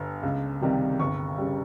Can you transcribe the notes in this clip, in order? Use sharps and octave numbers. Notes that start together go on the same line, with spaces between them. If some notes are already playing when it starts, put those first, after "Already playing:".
Already playing: G1
C#2
C3 D#3 G3
G1 C#6
C#3 G3